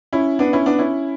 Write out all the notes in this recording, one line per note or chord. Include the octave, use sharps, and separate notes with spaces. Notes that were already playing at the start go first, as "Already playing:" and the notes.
C#4 E4
B3 D4
C#4 E4
B3 D4
C#4 E4